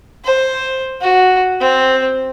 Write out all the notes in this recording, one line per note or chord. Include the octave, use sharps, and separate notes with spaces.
C5
F#4
C4